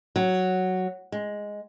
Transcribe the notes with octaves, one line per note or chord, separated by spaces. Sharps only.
F#3
G#3